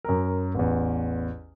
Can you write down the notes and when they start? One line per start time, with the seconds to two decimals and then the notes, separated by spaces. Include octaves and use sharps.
0.04 F#2 A#4
0.55 A1 E2